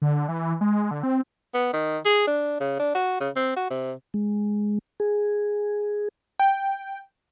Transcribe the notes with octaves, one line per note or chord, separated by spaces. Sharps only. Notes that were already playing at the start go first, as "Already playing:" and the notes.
D3
E3
G#3
D3
C4
B3
D#3
G#4
D4
C#3
D4
F#4
C#3
C4
F#4
C3
G#3
G#4
G5